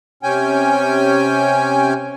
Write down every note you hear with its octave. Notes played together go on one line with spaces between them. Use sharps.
C3 C#4 G5 G#5